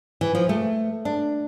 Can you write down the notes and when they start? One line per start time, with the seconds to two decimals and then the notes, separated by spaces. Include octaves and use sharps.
0.21 E3
0.35 F3
0.49 A3
1.05 D4